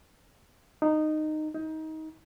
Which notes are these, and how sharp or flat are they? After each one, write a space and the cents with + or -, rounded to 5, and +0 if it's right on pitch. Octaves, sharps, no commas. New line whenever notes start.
D#4 -15
D#4 +20